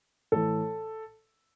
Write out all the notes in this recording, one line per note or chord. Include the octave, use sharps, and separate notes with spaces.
A2 E3 A4